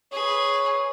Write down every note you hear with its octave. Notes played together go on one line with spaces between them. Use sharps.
G#4 B4 C#5